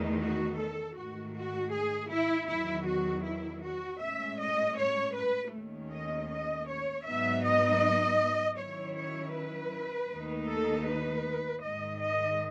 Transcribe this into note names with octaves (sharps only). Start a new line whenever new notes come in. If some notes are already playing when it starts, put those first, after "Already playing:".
Already playing: E2 D#3 A3 D#4
F#4
A4
G#2 D#3 A3 F#4
F#4
G#4
E4
E2 D#3 F#3 E4
F#4
E4
F#4
A2 G#3 C#4 E5
D#5
C#5
B4
D#2 D#3 A3 C#4
D#5
D#5
C#5
G#2 F#3 B3 D#4 E5
D#5
D#3 F#3 C#4 E4 C#5
C#5
B4
D#2 D#3 A3 D#4
A4
B4
G#2 D#3 G#3 D#5
D#5